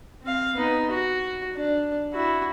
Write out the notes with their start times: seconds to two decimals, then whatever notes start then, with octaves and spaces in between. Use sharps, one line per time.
0.23 C4 F5
0.55 B3 D#4
0.90 F#4
1.56 D4
2.13 E4 F#4